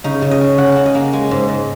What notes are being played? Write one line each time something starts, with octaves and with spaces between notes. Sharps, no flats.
C#3 D#4
C#3
D#5
C#4
C#3 F#5
C#3 F#5
D#5
A#3
G#3 G#5
G#2
G#2